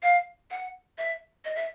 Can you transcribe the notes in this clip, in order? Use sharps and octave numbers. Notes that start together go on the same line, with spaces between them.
F5
F#5
E5
D#5
E5